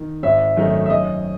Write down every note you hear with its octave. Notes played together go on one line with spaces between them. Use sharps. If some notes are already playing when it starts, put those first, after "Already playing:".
Already playing: D#3
G#1 E5
F#2 D#3 A3 D#4
E5
F#2 D#5